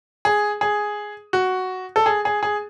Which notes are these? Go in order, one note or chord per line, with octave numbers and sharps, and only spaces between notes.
G#4
G#4
F#4
A4
G#4
G#4
G#4